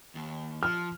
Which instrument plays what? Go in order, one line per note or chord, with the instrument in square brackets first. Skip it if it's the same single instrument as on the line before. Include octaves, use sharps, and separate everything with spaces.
[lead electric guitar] D#2
[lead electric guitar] F3 [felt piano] F6